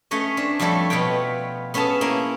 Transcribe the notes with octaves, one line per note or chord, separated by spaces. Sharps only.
A3 C#4 C#5 D#5
C4 D4
F2 G3 A3 A4 C#5
B2 B3 F4 C#5 G5
B3 C#4 G#4 A4 A5
A#3 C#4 E4